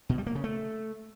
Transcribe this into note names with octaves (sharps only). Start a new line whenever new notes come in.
B2
G3
A#3
C#3
A3